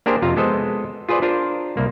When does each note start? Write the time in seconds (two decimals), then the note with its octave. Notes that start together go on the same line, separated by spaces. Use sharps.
0.06 A#3 D4 G4 G#4 A#4 C5
0.22 F2 C3 F4 F5 A#5
0.37 G#3 B3 A4 C5 D#5
1.09 F4 G#4 B4 C5 D5
1.22 D4 F4 A#4 C5 A#5
1.77 C2 A#3